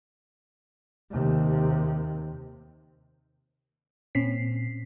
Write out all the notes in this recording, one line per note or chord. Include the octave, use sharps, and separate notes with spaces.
D#2 C3
A#2 C4 C#4 B6 C7